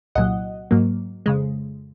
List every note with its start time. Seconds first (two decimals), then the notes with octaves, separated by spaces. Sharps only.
0.15 C2 A#2 F#3 D#5 F#5
0.71 G#2 F#3 A#3
1.26 F2 C#3 G#3